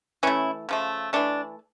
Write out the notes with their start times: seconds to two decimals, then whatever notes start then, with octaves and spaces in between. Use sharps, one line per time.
0.23 E3 A3 C#4 E4
0.69 C#3 F3 A3
1.13 E3 A3 D4